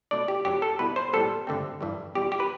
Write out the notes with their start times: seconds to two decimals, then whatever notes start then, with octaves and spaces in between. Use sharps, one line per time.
0.11 B2 A3 D4 D5
0.28 G4
0.45 F#2 F#3 B3 D4 G4
0.62 A4
0.79 B2 G3 B3 E4 B4
0.96 C5
1.13 A2 G3 B3 A4
1.47 G2 D3 A3 C4
1.81 G2 E3 G3
2.14 E2 B2 G3 G4
2.32 G4
2.40 B4